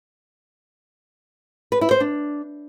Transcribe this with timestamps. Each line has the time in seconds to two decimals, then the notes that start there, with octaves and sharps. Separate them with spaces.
1.72 B4
1.81 E4
1.91 C5
2.00 D4